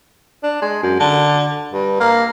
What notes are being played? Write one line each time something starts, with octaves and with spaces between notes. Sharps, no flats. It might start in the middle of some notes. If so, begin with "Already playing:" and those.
D4
G#3
F#2
D3
G2
A#3